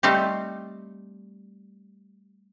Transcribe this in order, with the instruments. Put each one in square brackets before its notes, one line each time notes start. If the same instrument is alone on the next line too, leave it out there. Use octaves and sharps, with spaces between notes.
[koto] G3 A3 C4 D#4 G4